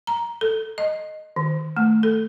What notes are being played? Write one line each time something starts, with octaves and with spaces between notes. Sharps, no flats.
A#5
A4
D#5
D#3
A3
A4